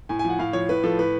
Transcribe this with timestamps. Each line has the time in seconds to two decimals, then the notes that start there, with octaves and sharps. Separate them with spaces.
0.09 A2 G#5
0.19 G#5
0.25 F3
0.30 F#5
0.39 A2 F5
0.53 F3 C#5
0.69 A2 B4
0.83 F3 A4
0.99 A2 B4